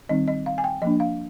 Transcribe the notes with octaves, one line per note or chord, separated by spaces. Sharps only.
D#3 G3 C4 D#4 D#5
D#5
F5
G#5
G5
F3 A#3 D4 D#5
F5